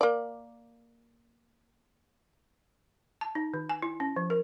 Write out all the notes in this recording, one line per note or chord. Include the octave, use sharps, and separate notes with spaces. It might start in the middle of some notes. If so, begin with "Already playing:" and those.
A#3 D5
A5
D#4
D#3
G#5
E4
C#4
F3
A#4